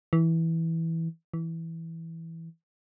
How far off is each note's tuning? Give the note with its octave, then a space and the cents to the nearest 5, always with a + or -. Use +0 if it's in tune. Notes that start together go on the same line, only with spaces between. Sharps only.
E3 -10
E3 -5